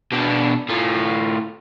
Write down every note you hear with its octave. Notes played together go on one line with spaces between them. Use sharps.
B2 D4
A2 F4